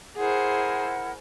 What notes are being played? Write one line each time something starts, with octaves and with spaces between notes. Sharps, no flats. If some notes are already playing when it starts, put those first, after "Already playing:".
E4 G#4 A#4 C5 F#5